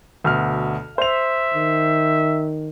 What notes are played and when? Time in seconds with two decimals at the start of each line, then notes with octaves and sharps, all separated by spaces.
0.24 D2 B2 F6
0.98 C5 E5 F7
1.54 D#3